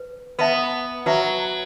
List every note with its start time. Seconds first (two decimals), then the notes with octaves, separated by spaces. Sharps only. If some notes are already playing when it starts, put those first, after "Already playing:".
Already playing: B4
0.38 B3 B4 E5 A5
1.06 F#3 B4 E5 A5